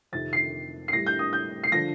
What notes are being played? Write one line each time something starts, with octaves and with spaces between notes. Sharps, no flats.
F2 C3 D#3 A6
C7
C7
A2 G3 A#6
G6
D#6
G6
C7
D3 F3 A#6